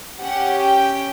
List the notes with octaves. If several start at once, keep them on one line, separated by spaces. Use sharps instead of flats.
C#4 G4 F#5
G5